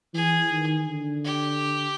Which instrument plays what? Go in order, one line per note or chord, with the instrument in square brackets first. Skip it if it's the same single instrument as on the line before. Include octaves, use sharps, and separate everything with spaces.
[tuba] E3 [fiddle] G#4
[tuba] D#3
D3
[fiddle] G4